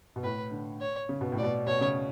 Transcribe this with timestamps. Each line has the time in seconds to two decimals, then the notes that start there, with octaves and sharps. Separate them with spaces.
0.16 B2
0.23 A2 B4
0.51 D3
0.81 C#5
1.09 C#3
1.21 B2
1.32 A2
1.38 D5
1.43 B2
1.67 B2 C#5
1.81 C#3